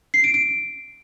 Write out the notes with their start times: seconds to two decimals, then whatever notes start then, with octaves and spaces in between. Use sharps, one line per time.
0.14 C7
0.24 D7
0.34 D7